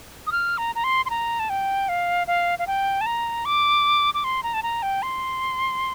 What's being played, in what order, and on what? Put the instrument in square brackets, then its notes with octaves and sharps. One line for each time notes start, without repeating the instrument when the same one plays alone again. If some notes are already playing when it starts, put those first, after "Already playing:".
[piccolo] D#6
F6
A#5
A#5
C6
C6
A#5
A5
G5
F5
F5
F5
G5
A5
A#5
D6
D6
C6
A#5
A5
A#5
G5
C6